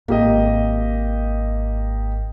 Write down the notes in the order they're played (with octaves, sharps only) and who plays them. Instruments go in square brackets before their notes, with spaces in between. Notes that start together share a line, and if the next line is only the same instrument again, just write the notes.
[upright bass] G#1 [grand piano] A#3 G4 D#5